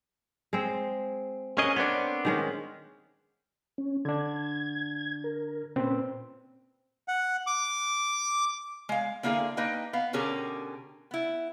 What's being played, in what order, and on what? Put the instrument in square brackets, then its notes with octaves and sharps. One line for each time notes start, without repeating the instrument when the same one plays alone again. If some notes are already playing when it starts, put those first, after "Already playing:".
[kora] G#3 C4
[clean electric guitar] C#4 G#4 D#5 [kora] A#4 F#5
[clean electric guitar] B3 C4 D4 [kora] C#5 D5
[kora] D#3 G#3 C#4
[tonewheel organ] C#4
[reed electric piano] D3 D4 [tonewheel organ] G#6
[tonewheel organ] A#4
[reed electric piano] A#2 C4 [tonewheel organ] C#4 B4
[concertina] F#5
D6
[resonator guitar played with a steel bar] G#3 F5
D3 A#3 D4 E4 G#4 F5
A#3 D#4 B4 D#5 G5
B3 F5
B2 D3 C#4 G4 G#4 A#4
B3 E4